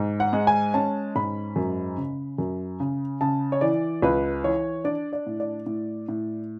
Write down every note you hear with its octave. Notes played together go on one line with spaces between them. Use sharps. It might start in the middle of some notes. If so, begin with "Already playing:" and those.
Already playing: G#2
F#5
G#3
G#5
C#4 A5
G#2 B5
F#2
C#3
F#2
C#3
C#3 A5
C#5
E3 D5
C#2 B4
E3 C#5
D4 D5
D5
A2
D5
A2
A2